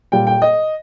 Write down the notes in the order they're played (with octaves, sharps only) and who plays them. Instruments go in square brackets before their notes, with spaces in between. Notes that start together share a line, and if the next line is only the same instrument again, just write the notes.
[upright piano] A#2 G3 G5
G5
D#5